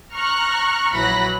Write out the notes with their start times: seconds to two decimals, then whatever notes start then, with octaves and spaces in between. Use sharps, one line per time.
0.13 A#5 C#6 F6 F#6
0.94 A#1 E3 F#3 B5 F#6 A#6